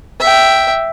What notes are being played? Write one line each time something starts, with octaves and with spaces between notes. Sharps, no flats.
E5 G5